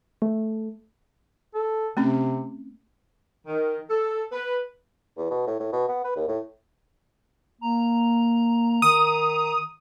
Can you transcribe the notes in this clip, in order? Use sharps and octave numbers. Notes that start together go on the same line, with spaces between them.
A3
A4
C3 A3 C4 C#4
D#3
A4
B4
E2
B2
A2
A2
B2
B3
B4
D#2
A2
A#3 A#5
D#3 D#6